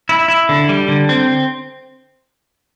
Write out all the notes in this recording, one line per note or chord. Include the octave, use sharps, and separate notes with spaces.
E4
E4
D3
G3
D3
C4